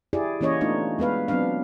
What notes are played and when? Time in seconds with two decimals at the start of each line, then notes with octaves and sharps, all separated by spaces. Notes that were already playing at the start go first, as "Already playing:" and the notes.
0.13 E4 G4 G#4 D5
0.41 E3 A#3 C#4 C#5 D#5
0.61 A3 B3 D4 D#4 F4
0.99 G#3 B3 B4 F5
1.28 F#3 B3 C4 D4 F5